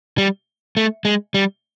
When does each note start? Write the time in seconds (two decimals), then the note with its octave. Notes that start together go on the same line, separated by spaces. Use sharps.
0.18 G3
0.77 A3
1.05 G#3
1.34 G3